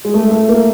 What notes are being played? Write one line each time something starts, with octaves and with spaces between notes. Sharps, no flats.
G#3
A3
A3
A#3